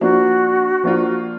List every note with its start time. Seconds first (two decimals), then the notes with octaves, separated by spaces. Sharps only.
0.01 F3 A#3 D4 F4 F#4
0.84 F3 A#3 D4 F4